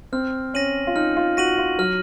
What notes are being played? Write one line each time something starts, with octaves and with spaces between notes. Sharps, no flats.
C4 F6
C#4 A#6 D#7 F#7
F4
D#4 F6
F4
F#4 A#6 D#7 F#7
F4
F#3 F6